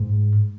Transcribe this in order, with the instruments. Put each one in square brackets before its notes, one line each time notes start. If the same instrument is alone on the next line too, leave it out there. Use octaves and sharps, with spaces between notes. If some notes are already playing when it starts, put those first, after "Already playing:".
Already playing: [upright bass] G#2